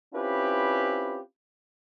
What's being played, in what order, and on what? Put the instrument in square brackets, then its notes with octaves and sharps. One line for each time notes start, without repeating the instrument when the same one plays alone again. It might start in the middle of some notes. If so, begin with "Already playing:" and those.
[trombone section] C4 C#4 E4 F4 G4 B4